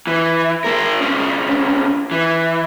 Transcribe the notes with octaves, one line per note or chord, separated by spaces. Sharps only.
E3
G#3 A#4
C2 C#4
E3